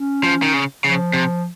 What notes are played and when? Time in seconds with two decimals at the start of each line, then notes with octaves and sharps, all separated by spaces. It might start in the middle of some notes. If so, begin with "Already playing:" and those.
Already playing: C#4
0.24 F3
0.42 D#3
0.54 C#3
0.84 C#3 F3
1.14 C3